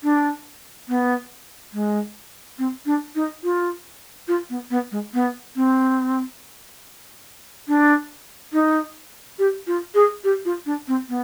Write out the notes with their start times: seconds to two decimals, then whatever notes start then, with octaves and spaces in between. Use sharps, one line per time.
0.03 D4
0.88 B3
1.73 G#3
2.58 C4
2.86 D4
3.15 D#4
3.43 F4
4.28 F4
4.50 B3
4.70 B3
4.91 G#3
5.14 B3
5.56 C4
7.68 D4
8.53 D#4
9.38 G4
9.67 F4
9.94 G#4
10.24 G4
10.45 F4
10.66 D4
10.87 C4
11.09 B3